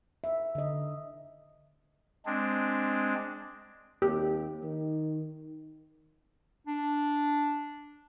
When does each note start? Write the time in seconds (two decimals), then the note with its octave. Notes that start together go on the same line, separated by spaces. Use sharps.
0.24 E5
0.55 D3 D#5
2.26 G#3 C4 D4
4.02 D#2 G4
4.63 D#3
6.67 D4